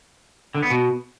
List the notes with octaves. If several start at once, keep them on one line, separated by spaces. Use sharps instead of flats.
D3
B3
B2